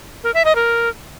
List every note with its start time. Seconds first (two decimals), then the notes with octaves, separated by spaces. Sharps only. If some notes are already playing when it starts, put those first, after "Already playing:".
0.24 A#4
0.34 E5
0.45 D#5
0.55 A#4